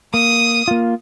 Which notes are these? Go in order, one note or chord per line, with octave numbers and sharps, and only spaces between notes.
A#3 D#6
A#3 F4